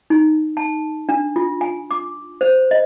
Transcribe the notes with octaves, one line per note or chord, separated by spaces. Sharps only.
D#4
A5
D4
F4
G#5
D6
C5
D#5